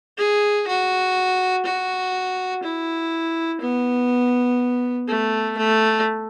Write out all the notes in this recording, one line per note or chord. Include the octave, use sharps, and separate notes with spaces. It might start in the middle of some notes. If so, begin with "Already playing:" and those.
G#4
F#4
F#4
E4
B3
A3
A3